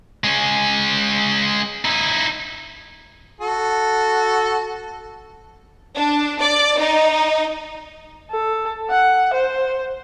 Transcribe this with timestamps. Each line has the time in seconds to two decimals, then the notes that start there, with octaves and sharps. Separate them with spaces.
0.24 G#3 C#4
1.85 D#4 E4
3.41 F#4 A4
5.94 D4
6.40 D5
6.77 D#4
8.31 A4
8.90 F#5
9.33 C5